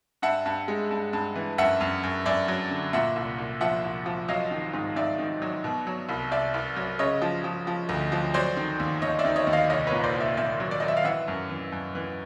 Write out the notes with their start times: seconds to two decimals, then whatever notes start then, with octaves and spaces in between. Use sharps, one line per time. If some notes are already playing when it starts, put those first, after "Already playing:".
0.22 G2 E5 F#5
0.46 G2
0.68 G#3
0.91 G2
1.13 G2
1.36 E3
1.58 F#2 E5 F#5
1.81 F#2
2.03 F#2
2.26 F#2 D5 E5
2.48 F#3
2.71 D3
2.93 A#2 E5 F#5
3.16 C2
3.38 C2
3.61 F3 E5 F#5
3.84 C2
4.06 F3
4.28 F#3 D#5 F5
4.51 D#3
4.73 G#2
4.96 G#2 D5 E5
5.19 D#3
5.42 F#3
5.64 B2
5.87 F#3
6.09 C2
6.32 C2 D5 E5
6.54 C2
6.76 F#3
6.99 C#3 C#5 D#5
7.22 F3
7.44 F3
7.67 F3
7.89 D2
8.12 F3
8.34 F#3 C5 D5
8.57 D#3
8.79 D#2
9.02 D#2 C#5 D#5
9.19 D5 E5
9.25 D#3
9.36 C#5 D#5
9.47 D#2
9.53 D#5 F5
9.69 C2 C#5 D#5
9.87 B4 C#5
9.92 A#2
10.03 C5 D5
10.15 C2
10.20 D5 E5
10.37 A#2 D5 E5
10.60 F#3
10.71 D5
10.80 F#3 D#5
10.88 E5
10.97 F5
11.05 E3 E5 F#5
11.28 F#2
11.50 E3
11.72 F#2
11.95 E3